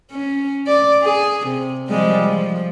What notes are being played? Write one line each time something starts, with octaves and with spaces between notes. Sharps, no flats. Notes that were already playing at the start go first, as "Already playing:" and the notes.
C#4
D5
G#4
C3
F3 G3 G#3
F3